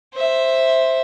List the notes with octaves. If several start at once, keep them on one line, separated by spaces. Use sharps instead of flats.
C5 E5